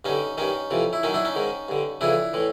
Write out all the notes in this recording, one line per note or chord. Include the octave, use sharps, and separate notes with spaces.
G2 D3 C#4 D#4
G2 D#3 C#4 D#4
F2 C3 E3
E4
F#2 D#3 C#4 D#4
D4 E4
C#4 D#4
G#2 D#3
G2 D3
F2 C#3 E3 D4 E4
A2 E3